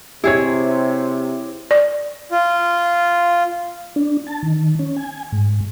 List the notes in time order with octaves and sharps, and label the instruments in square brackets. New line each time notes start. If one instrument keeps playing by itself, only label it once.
[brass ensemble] C3 [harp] E4 G#4 C#5 [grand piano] G4 G#6
[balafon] D5
[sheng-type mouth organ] F4
[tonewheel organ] D4
A5
D#3
C#4
G#5
G#2